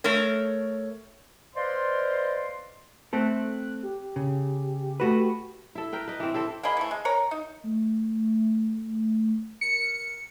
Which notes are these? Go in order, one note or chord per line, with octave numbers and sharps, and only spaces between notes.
A3 A4 A#4 C#5
B4 C5 D5 D#5 F5 C6
A3 C4 A4 F#6
G4
C#3
A3 F#4 B4
E4 A4
A#4 B4 G5
B4 D#5
E3 C4
C4 E4 A4
A#3 G#4 D#5 B5
E3 A3
G#3
A#4 C#5 A#5
D#4
A3
A#4 C#7